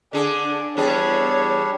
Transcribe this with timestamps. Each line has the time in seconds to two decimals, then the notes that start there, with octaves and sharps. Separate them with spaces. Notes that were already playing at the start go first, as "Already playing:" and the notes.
0.13 D3 D4 G#4
0.77 E2 G3 D4 G#4 C#5 D5